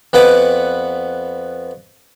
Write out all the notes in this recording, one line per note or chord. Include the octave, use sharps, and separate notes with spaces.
F2 B3 B4 F#5 D6